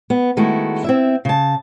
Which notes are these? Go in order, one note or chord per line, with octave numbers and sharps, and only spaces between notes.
B3
D#3 G#3 A3 E4 F#4
C4 E4 E5
C#3 A5